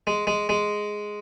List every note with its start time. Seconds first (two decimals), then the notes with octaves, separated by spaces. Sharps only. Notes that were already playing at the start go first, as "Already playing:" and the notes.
0.07 G#3
0.27 G#3
0.49 G#3